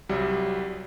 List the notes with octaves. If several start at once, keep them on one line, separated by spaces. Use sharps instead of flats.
C2 F#3 G3